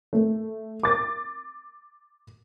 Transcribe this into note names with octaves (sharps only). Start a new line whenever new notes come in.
A3
D6 A6